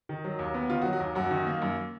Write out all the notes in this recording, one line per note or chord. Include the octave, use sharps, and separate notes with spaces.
D#3
F#3
D#2
B3
D#3 F4
F#4
F#3
F#4
D#2
F#2 F#4
D#3
A#3
F#2